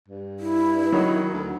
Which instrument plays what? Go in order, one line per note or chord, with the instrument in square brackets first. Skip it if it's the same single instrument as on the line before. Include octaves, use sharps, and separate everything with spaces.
[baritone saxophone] G2
[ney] E4
[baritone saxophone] D#3 [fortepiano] F#3 D#4
[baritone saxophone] D2